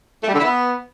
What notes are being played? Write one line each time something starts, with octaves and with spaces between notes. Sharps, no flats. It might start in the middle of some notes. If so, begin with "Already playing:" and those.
A3
G3
D3
E4
B3